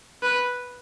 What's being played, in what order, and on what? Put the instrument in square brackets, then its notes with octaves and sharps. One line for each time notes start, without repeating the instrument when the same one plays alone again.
[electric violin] B4